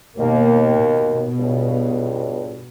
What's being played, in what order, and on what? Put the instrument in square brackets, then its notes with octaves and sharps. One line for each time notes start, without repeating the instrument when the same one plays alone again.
[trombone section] D#2 [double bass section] B2 A#3
[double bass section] B2
[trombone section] C#2 G2